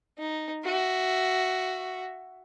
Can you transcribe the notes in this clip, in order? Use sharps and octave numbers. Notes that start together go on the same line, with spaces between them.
D#4
F#4 E5